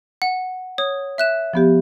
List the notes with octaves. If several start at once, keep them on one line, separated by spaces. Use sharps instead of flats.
F#5
C#5 D#6
E5 F#6 E7
F3 B3 G4